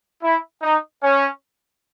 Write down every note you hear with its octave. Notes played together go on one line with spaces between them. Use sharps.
E4
D#4
C#4